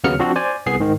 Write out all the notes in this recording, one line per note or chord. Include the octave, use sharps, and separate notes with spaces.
D#2 C#3 F#3 B3 F6 C#7
F3 C4 D4 F#4
C5 D5 G#5
C2 B3 G#4 C7
G#2 D#3